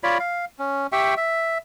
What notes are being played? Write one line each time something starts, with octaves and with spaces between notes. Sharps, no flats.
F4 C#5 D5 B5
F5
C#4
G4 E5 G5 C#6
E5